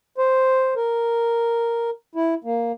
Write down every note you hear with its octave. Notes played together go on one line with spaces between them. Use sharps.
C5
A#4
E4
A#3